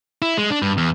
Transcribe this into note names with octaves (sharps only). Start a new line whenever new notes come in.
E4
G#3
D4
G2
E2